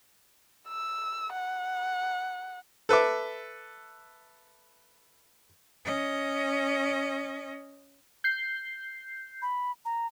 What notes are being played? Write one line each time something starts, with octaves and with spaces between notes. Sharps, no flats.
E6
F#5
A4 B4 E5 D6
C#4 D#5
G6 C7
B5
A#5